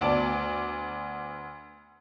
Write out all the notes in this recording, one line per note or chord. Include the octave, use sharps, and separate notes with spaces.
D2 B3 D5 A5 D7